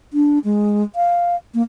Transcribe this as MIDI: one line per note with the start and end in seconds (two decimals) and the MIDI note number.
0.13 0.39 62
0.44 0.83 56
0.96 1.36 77
1.54 1.62 58